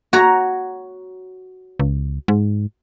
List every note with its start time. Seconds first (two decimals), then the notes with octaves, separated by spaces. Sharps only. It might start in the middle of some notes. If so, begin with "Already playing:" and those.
0.13 F#4 C#5 A#5
1.80 C#2
2.28 G#2